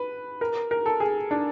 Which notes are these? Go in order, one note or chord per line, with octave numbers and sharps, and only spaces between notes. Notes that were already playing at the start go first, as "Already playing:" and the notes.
Already playing: B4
A#4
A#4
A4
G#4
D4